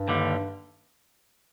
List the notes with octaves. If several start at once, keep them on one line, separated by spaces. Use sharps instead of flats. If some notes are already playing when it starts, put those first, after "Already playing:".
Already playing: G2
D#2 D3 G3